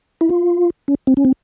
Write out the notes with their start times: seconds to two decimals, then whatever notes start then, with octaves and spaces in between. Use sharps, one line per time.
0.21 E4
0.29 F4
0.88 C#4
1.07 C4
1.17 C#4
1.25 C4